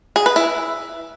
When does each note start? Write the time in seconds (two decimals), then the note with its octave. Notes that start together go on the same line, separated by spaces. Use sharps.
0.16 G#4
0.26 B4
0.36 E4